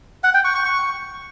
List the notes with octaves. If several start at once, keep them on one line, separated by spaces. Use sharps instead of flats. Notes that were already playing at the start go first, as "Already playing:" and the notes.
F#5
G5
C#6
C#6
C#6